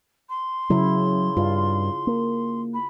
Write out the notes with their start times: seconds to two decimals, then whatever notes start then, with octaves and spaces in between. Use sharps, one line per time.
0.29 C6
0.70 C#3 F#3 E4
1.37 G2 F4
2.07 A#3
2.74 B5